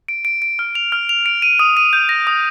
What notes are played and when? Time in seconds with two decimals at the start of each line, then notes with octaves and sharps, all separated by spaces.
0.08 D7
0.25 D7
0.42 D7
0.59 F6
0.75 F7
0.92 F6
1.09 F7
1.26 D7
1.42 D#7
1.59 D#6
1.77 D#7
1.93 G6
2.09 A#6
2.27 D#6